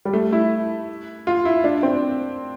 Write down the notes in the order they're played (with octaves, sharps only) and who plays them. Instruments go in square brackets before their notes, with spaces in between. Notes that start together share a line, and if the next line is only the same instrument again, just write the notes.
[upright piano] G3
A3
E4
F4
E4
D4
C4